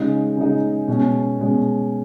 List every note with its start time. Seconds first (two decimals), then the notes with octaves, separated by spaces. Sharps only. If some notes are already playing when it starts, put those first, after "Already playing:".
Already playing: C#3 G#3 D#4
0.37 C#3 G#3 D#4
0.88 B2 G#3 C#4
1.39 B2 G#3 C#4